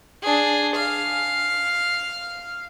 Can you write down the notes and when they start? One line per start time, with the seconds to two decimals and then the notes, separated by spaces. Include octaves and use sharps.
0.22 D4 G#4
0.76 F5